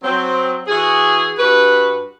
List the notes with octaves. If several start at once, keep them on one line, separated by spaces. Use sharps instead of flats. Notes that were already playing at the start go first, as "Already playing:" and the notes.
F#3 C4
E3 F#4 G#4
G2 F#4 B4